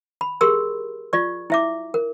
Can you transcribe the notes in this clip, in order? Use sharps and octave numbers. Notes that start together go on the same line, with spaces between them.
B5
G4 G#4 A#4 C6 E6
F4 D5 C#6
E4 E5 D6
A#4